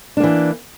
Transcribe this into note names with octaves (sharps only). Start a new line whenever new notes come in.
E3 A#3 D4